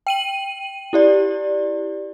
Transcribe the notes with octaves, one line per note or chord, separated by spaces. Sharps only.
G5 D#7 F#7
E4 G4 D5